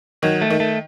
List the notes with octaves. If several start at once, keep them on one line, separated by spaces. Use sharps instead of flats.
D#3 F#3
A3
D#3
A3